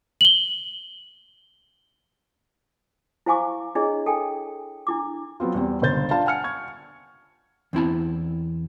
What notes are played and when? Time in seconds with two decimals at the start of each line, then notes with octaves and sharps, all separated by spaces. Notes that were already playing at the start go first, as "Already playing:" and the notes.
0.21 F#7 G7
3.26 E4 C5 F5 G#5 C#6 D6
3.75 D4 E4 G#4 C#5 D#5
4.06 A4 G5 G#5
4.87 D4 E4 D6
5.40 F#3 B3 C4 F4
5.54 E2 G3 C4
5.82 G1 C#2 C5 G6 A6
6.11 D4 F4 F5 A5
6.26 F#5 G#5 F6 C#7
6.44 C#6 G#6
7.73 E2 C4 E4 A5